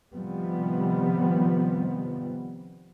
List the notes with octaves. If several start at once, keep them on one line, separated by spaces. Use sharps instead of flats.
C3 D#3 F3 G3 B3 C4